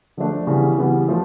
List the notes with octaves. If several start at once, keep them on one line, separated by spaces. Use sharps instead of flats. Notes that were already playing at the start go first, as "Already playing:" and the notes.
D3 F3 A3 D4
C#3 E3 G3 B3
C#3 E3 G3 B3
F3 A3 F4